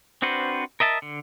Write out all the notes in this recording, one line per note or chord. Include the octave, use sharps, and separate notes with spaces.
C4 D4 F#4 B4 C5
A#4 D#5 E5 A5
D3